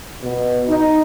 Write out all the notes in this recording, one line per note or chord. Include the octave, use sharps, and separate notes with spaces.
B2
D#4